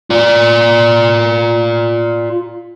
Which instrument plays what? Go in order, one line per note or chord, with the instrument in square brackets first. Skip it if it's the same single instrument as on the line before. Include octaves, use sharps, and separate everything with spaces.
[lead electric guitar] F4 D5